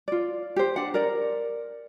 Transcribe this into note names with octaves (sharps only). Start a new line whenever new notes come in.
F4 D5
G4 C5
D4 F#5
A#4 D5